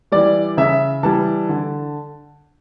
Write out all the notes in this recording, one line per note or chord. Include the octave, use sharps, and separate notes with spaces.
E3 G3 D5
C#3 E5
E3 G3 A5
D3